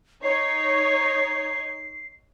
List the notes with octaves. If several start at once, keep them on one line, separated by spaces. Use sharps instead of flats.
D#4 C#5 C7